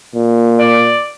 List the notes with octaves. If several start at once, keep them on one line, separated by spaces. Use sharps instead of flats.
A#2
D5